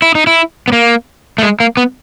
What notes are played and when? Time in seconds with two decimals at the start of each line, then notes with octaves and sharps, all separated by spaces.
0.02 E4
0.15 D#4
0.27 E4
0.68 B3
0.73 A#3
1.38 A3
1.42 G#3
1.60 A#3
1.77 B3